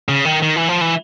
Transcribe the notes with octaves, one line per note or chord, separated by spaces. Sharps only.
C#3
D#3
D#3
E3
F3
E3